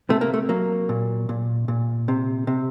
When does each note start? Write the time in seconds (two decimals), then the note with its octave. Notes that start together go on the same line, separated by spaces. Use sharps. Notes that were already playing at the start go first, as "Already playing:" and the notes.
0.10 C3 A3
0.21 A#3
0.34 A3
0.49 F#3 A#3
0.89 A#2
1.29 A#2
1.68 A#2
2.08 C3
2.47 C3